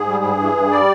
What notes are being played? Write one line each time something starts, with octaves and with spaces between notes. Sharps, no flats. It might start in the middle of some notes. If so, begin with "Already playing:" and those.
Already playing: G#2 G#4
G3
G2
E3
G2
G3 D5